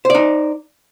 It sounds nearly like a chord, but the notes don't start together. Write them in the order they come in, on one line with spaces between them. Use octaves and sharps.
C5 D5 D#4